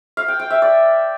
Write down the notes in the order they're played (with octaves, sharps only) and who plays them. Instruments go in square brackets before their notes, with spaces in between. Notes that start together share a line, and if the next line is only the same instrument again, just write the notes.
[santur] F5
G5
G5
E5
D5